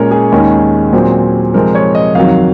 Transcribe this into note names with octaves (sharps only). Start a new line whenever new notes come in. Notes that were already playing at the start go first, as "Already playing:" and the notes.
Already playing: A#2 G#3 C#4 A#4 C#5
G#4
D#2 D#3 G#3 C#4
A#2 F#3 C4
C3 F3 G#3 C4 A#4
C#5
D#5
F2 D#3 F#3 F5